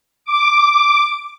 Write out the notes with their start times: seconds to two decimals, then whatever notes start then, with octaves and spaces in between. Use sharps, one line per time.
0.25 D6